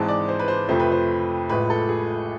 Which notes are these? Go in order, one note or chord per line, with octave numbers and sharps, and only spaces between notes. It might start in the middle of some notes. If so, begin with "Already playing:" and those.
Already playing: G#1 G#2 E3 G#3 C4 A5
D5
C5
B4
C5
F2 C3 F3 A3 C5
B4
C5
A1 A2 F3 G#3 B4
A4
G#4